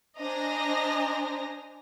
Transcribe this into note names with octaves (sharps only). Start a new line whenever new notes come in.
D4 C5 D#5 G#5 A#5 A#6